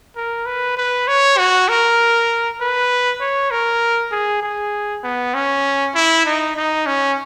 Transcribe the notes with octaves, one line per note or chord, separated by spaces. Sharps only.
A#4
B4
B4
C#5
F#4
A#4
B4
C#5
A#4
G#4
G#4
B3
C#4
E4
D#4
D#4
C#4